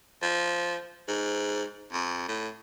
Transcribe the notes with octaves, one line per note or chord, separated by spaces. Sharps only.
F3
G#2
F2
A2